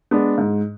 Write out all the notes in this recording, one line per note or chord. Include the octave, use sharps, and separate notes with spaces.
G#3 B3 D4
G#2